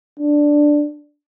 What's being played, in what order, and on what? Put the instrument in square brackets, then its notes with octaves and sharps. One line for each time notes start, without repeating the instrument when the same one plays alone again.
[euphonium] D4